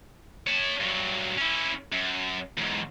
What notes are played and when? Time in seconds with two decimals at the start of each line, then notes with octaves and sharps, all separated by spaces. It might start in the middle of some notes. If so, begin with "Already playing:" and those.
0.47 C#5 A5
0.80 G2 F#3
1.37 C#4 E4
1.92 F#2
2.57 E2 G#2